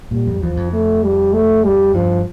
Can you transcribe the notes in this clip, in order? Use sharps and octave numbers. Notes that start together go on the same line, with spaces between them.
A#2 G3
F2
E2 F3
F2
A3
G3
A3
G3
G2 F3